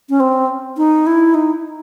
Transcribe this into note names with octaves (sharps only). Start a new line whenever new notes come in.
C#4
C4
D#4
E4
D#4